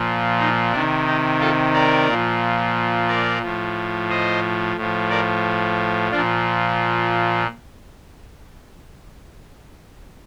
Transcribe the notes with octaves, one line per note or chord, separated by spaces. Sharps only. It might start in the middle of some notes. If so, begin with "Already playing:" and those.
Already playing: A#2 F3
D#4
C3 D#3 D4
D#4
F4 A4
A#4 D5
A#2 F3
A#4 D5
A2 F3
C5 D#5
A2 F3
A#4 D5
A#2 F3 D4 F4